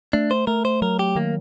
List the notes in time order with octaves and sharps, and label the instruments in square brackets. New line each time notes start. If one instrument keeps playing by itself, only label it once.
[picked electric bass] A3 [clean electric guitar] D4
[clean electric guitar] C5
[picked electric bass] A3 [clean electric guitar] A#4
[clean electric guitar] C5
[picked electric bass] F#3 [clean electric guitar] A#4
[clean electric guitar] G4
[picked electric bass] D#3 [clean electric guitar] A#3